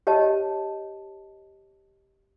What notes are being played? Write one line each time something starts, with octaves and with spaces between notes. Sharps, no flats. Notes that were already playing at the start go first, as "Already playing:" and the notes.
G4 C#5 D#5 A5